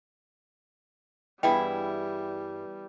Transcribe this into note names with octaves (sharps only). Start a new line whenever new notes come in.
G2 E3 G3 B3 E4 G#4 D#5 G5